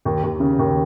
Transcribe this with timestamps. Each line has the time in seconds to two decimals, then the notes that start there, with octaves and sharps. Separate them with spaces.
0.05 D#2
0.23 D#2
0.40 C#3
0.59 D#2